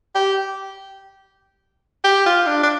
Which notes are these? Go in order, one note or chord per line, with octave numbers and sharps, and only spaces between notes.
G4
G4
F4
D4
D4